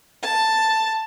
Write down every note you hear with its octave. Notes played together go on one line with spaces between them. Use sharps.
A5